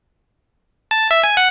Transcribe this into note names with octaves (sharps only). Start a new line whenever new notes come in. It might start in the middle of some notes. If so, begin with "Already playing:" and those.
A5
E5
G#5
F#5